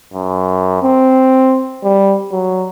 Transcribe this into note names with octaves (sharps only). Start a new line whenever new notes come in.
F#2
C4
G3
F#3